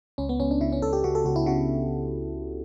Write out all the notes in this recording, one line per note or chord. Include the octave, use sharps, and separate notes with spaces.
C#2 C#4
B3
C#2 C#4
D4
C#3 E4
C#4
C#2 A4
G4
C#3 F#4
A4
C#2 F#4
E4
C#3 F#4